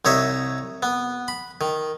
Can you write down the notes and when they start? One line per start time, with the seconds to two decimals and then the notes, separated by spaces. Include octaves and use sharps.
0.05 C2 D#4 C#5 E5
0.83 B3
1.28 B5
1.61 D#3